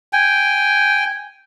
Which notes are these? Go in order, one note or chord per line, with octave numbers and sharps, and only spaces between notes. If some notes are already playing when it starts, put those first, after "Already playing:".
G5 G#5